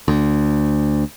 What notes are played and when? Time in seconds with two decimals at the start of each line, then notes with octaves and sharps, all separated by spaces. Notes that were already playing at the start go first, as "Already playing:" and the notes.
0.08 D2